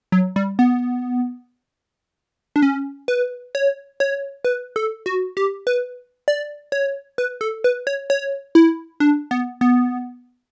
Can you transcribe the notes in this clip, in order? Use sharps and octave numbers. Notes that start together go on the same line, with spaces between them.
F#3
G3
B3
D4
C#4
B4
C#5
C#5
B4
A4
F#4
G4
B4
D5
C#5
B4
A4
B4
C#5
C#5
E4
D4
B3
B3